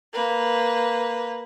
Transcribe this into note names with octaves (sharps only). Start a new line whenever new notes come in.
A#3 B4